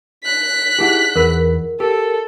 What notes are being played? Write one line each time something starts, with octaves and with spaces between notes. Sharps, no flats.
F#6 B6
D#4 E4 G4 G#4 F#5
E2 A#4 B4
G4 A4 A#4